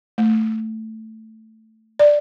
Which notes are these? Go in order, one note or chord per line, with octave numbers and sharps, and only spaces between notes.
A3
D5